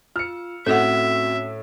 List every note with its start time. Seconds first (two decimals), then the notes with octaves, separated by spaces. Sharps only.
0.16 F4 E6 F6 C#7
0.66 A2 C4 C#4 F#4 A4 E5 F#5